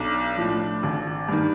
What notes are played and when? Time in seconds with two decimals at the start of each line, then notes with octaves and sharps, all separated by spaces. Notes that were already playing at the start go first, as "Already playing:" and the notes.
Already playing: B1 D4
0.38 A2 F3
0.83 G#1
1.28 G2 D#3